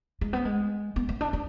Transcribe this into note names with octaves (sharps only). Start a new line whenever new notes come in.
G#3
B3
G#3
B3
B3
D4
D4